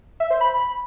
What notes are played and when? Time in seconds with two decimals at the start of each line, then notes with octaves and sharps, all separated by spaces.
0.20 E5
0.30 C5
0.41 B5